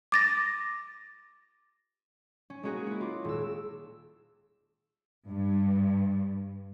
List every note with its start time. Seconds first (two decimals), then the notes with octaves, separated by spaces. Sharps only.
0.12 D6 A6 A#6
2.50 C#4
2.63 G#3 A#3 C#4 F#4 G#4
2.87 E4 F#4
3.01 F4 D6
3.25 D#1 E6
5.29 G2